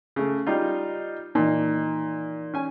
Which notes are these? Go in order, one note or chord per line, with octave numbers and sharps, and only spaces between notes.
C#3 A3
G3 D#4 F4
A#2 E3 D#4
C#4 G#5